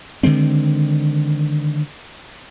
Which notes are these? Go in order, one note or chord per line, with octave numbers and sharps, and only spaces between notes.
D3 D#3 G#3 C4